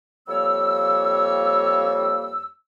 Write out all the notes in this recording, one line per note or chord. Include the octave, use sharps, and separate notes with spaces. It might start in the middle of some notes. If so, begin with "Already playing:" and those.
F2 G3 A#3 C#5 E6